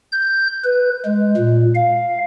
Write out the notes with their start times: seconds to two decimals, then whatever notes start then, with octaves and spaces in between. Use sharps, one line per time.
0.12 G6
0.64 B4
1.05 G#3
1.37 A#2
1.75 F5